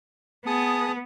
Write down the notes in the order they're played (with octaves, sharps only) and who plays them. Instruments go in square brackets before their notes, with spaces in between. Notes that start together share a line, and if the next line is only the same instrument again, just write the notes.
[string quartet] B3 [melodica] G#4 A5 D#6